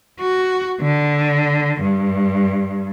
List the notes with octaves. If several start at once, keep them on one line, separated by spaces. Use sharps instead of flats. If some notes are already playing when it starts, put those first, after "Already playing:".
F#4
D3
G2